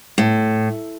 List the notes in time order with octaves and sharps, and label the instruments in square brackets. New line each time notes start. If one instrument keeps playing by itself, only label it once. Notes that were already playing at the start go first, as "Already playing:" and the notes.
[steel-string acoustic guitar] A2